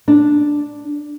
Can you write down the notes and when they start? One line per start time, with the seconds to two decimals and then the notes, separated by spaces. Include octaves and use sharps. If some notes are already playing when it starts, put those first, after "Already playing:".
0.08 D4